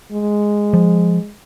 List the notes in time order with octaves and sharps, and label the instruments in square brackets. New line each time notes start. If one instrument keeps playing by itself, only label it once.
[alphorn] G#3
[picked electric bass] F3